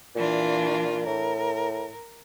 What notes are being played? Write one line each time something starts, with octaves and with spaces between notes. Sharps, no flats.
A#2 E3 D4 F4
A2 A#4